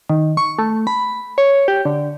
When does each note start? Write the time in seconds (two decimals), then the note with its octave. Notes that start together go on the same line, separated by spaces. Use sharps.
0.10 D#3
0.37 C#6
0.59 A3
0.87 B5
1.38 C#5
1.68 G4
1.85 D3